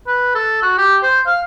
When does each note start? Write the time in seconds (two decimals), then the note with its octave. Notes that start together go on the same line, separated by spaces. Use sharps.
0.07 B4
0.35 A4
0.62 F#4
0.78 G4
1.03 C5
1.26 F5